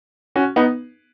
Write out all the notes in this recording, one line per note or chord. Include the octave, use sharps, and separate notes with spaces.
C#4 F#4
B3 D#4